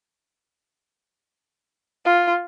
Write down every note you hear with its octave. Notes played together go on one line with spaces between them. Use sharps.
F4